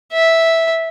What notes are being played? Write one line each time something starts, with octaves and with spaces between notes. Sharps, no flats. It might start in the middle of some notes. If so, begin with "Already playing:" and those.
E5